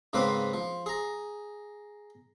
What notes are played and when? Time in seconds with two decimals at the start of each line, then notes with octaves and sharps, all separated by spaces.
0.13 G#2 C#3 A#3 C4 B4 B5
0.53 F3
0.86 G#4 A#5